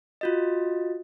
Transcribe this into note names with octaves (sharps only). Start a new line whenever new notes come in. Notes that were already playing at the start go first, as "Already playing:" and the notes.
F4 F#4 D#5